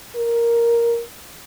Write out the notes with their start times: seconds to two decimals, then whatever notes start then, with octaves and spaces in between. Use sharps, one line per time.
0.15 A#4